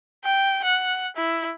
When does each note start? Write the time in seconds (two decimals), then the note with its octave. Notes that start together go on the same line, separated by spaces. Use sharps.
0.25 G5
0.65 F#5
1.17 E4